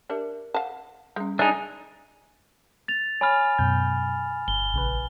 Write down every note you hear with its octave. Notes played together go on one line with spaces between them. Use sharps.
D4 G4 A#4 E5
F5 F#5 A5
G3 G#3 C#4
G#3 D4 D#4 E5 G#5
A6 F7
C#5 G#5 B5 F6 A6
F#2 B2 G6
G1 G7
A#1 C#3 B4